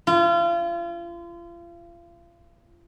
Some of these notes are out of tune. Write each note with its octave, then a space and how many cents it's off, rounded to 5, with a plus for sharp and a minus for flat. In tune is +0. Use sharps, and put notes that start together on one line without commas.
F4 -35